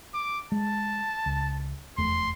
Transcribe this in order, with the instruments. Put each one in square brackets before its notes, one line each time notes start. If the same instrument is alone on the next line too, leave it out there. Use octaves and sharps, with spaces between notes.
[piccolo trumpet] D6
[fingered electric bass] G#3 [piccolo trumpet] A5
[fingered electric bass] C#2
[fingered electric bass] F1 E2 A3 [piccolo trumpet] C6